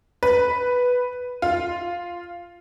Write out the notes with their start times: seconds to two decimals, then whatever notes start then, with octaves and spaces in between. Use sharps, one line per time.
0.23 B4
1.42 F4